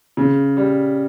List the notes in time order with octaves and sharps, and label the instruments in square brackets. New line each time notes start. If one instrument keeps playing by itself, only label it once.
[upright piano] C#3
G3